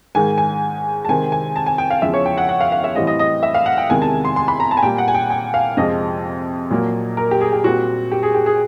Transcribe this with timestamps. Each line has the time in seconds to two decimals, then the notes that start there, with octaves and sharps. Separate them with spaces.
0.15 G#2 D#3 G#3 G#5
0.38 G#5
1.05 A5
1.09 C3 D#3 G#3 C4 G#5
1.32 G#5
1.56 A5
1.66 G#5
1.78 G5
1.90 F5
2.02 E2 C#3 F3 E5
2.14 C#5
2.26 G5
2.38 F#5
2.49 F#5
2.61 F5
2.72 F5
2.84 E5
2.96 A2 E3 G3 C4 D#5
3.07 D#5
3.19 D#5
3.43 E5
3.54 F5
3.66 F#5
3.78 G5
3.89 E2 C3 D#3 G#3 G#5
4.02 A5
4.25 C6
4.36 C6
4.48 B5
4.60 A#5
4.71 A5
4.77 G#5
4.82 A#2 G3 A#3 G5
4.98 F#5
5.08 G#5
5.14 G5
5.30 G5
5.54 F5
5.77 F2 C3 F3 G#3 C4 D#5
6.70 A#2 F#3 A#3
7.17 A#4
7.31 G4
7.41 G#4
7.53 G4
7.64 A#2 G3 C4 F#4
8.11 G4
8.23 G#4
8.34 G4
8.46 G#4